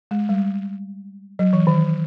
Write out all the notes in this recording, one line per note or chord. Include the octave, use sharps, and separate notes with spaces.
G#3
G3
F#3
E3
D#3